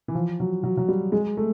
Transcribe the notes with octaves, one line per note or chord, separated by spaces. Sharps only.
E3
F3
F#3
F#3
F#3
G3
G#3
A3